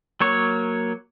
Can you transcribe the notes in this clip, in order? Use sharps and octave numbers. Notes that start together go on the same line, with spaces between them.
F#3 A#3 C#5